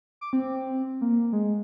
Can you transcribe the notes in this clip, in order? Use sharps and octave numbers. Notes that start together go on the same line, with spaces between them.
D6
C4
A#3
G#3